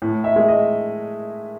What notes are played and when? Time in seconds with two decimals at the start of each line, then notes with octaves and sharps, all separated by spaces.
0.02 A2
0.24 E5
0.36 G#3
0.48 D#5